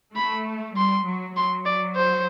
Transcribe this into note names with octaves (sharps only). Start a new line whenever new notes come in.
A3 B5
G3 C6
F#3
F#3 C6
D5
C5